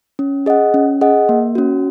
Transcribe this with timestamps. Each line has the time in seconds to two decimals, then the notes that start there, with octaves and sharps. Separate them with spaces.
0.19 C#4
0.46 G#4 D#5 F#5
0.74 C#4
1.01 G#4 D#5 F#5
1.29 A#3
1.55 C#4 F#4